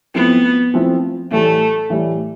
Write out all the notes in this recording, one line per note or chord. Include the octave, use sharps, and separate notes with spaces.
F3 A3 B3 C4 E4
F3 A3 C4 E4
A2 E3 G3 A3
A2 E3 G3